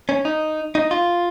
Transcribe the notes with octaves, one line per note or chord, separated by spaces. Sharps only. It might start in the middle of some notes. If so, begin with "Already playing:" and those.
C#4
D#4
D#4
F4